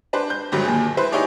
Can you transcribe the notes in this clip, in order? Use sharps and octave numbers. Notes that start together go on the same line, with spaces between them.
D4 B4 C5
G6
G#1 G2 D3 F#3
D#2 A#2 G#4
E4 B4 C5
D#4 E4 G4 G#4 C#5 D5